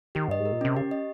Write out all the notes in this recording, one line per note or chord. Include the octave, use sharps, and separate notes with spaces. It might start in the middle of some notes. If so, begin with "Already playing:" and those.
D#3 G4
G2 D#5
G#2
A#4
A#2
C3 C#4
C#3 G4
D#5